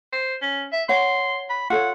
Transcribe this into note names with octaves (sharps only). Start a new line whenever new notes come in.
C5
C#4
E5
C#5 F#5 C6
B5
F4 A4 C#5 F#5